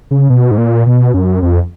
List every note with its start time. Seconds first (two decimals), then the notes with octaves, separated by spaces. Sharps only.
0.11 C#3
0.30 B2
0.51 G#2
0.58 A#2
0.86 B2
1.14 F#2
1.42 F2